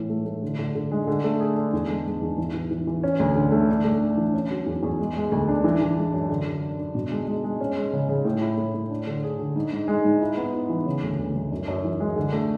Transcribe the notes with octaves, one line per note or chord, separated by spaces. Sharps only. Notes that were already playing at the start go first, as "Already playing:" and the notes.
Already playing: A2 E3
A3
A3
D3
D3
D3
G#3
D3
A3
G#4
D4
E2
G#3
G#3
E2
E3
E3
E3
E3
C#4
D2
D3
A3
D4
A3
D4
E3
C#4
F#3
E2
E2
G#3
G#3
D2
D4
E3
E3
G#3
F#2
D3
D3
D4
D4
B2
G#3
G#3
G#3
C#4
G#3
C#3
C#3
A2
E4
A2
A2
D4
D3
G#4
D3
G#2
G#2
G#3
G#2
E4
B3
E4
E3
C#3
D2
D2
D2
F#2
F#2
E3
G#3
D3
A3